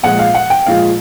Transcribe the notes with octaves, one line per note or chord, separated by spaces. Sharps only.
A#2 F3 G#3 F#5
F5
F#5
G5
A#2 F3 G#3 F5